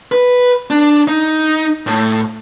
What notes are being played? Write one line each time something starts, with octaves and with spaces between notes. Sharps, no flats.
B4
D4
D#4
A2